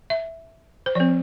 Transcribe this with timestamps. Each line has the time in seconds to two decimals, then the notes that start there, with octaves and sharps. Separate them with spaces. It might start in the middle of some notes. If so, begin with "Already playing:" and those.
0.10 E5
0.86 C5
0.95 F3 C4 D5